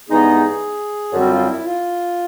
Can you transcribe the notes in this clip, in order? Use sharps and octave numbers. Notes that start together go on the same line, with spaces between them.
G2 E3 G#3 B3 D#4 G#4
F#2 D3 G3 C4 F#4
F4
E4
F4